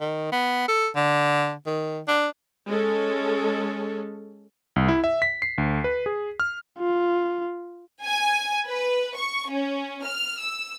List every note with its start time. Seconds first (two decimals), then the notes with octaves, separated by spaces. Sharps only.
0.01 D#3
0.32 B3
0.68 A4
0.96 D3
1.66 D#3
2.07 D4
2.67 G#3 C#4 A4
4.76 C2
4.88 E4
5.04 E5
5.22 B6
5.42 C7
5.58 D2
5.84 B4
6.06 G#4
6.40 F6
6.79 F4
8.04 G#5
8.66 B4
9.16 C#6
9.51 C#4
10.05 F6
10.41 E6